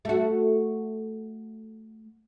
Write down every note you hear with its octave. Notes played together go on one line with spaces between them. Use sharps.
A3 F#4